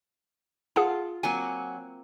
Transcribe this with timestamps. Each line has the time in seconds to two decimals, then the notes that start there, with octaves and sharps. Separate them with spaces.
0.76 F4 G#4 F#5 A5
1.23 F#3 A#3 C4 G#5 C#6